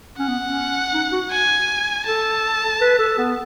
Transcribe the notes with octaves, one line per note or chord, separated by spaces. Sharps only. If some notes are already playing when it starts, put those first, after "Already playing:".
C#4 F#5
B3
C#4
D#4
F#4
G#5
A4 A5
B4
A4
B3